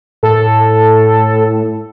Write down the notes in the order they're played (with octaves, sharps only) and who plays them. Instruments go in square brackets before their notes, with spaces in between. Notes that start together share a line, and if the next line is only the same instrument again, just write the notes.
[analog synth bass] A2 [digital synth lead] A4